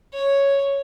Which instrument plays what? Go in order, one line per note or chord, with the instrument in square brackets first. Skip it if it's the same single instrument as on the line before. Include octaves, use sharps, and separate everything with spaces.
[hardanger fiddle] C#5